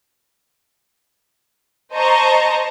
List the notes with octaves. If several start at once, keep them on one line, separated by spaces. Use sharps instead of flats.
C5 D#5 A5 A#5 C#6